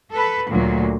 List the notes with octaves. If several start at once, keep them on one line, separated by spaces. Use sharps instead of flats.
A4 B4
D2 A#2 F#3